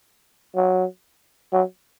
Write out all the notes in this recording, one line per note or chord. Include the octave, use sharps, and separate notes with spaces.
F#3
F#3